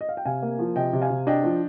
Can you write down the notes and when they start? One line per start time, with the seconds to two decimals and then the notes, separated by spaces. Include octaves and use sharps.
0.01 D#5
0.09 F5
0.17 G5
0.25 C3 F5 G#5
0.43 A#3
0.59 F3
0.76 C3 D#5 G5
0.93 C3
1.01 F5 G#5
1.10 C3
1.27 D4 D#5 G5
1.44 F3